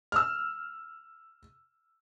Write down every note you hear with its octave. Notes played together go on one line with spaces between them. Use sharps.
E6 F6